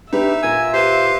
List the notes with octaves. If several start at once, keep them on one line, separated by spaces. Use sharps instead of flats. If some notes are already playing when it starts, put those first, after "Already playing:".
D4 D#4 G4 B4 E5
A#2 F4 A#4 G#5 E6
G4 B4 C5 F5